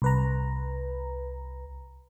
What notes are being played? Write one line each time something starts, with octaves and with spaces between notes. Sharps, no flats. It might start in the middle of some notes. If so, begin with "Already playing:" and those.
C2 B4 A#5